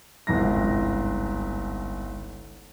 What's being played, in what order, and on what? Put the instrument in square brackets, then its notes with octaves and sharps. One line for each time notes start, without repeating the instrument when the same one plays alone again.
[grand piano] G1 C2 G#2 A#6